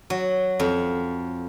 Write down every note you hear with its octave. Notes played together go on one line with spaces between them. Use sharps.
F#3
F2